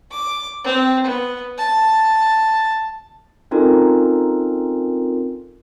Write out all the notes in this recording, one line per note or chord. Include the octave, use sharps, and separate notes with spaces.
D6
C4
B3
A5
C4 C#4 D#4 F4 A4 A#4